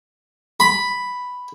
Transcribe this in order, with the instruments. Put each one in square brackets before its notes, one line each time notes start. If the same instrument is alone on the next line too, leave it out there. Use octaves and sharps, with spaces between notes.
[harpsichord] B5